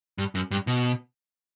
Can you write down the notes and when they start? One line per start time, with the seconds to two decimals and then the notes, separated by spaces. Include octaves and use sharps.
0.18 G2
0.35 F#2
0.51 G2
0.67 B2